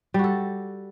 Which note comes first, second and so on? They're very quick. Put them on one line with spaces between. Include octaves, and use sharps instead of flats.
G3 F#4 A4